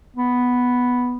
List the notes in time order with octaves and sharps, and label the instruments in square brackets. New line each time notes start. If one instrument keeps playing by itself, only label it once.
[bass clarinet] B3